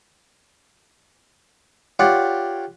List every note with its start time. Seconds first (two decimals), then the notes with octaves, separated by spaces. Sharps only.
1.99 F4 G4 C#5 D5 F#5